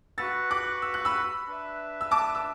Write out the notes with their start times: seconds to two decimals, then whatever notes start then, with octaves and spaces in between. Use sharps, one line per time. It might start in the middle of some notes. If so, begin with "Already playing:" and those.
0.18 F#4 B4 F#5 E6 A6
0.51 D6 F#6
0.82 E6
0.94 F#6
1.05 B5 E6
1.47 D4 B4 E5
2.01 E6
2.11 A5 D6
2.35 E6